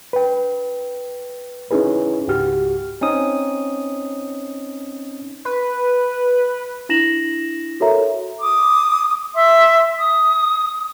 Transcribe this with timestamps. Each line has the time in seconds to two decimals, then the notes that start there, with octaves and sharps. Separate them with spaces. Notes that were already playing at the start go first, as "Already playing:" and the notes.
0.13 B4 G5
1.71 C#4 D#4 E4 G#4 B4
2.28 C#2 G#2 F#4 G4 F6
3.01 C4 C#4 D#4 D#6
5.45 B4
6.89 D4 E4 A#6 E7 F#7
7.80 F#4 A4 A#4 C#5 E5 A#5
8.41 D6 D#6
9.35 E5 C6
9.99 D#6